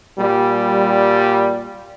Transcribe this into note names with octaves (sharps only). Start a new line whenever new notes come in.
A#2 G3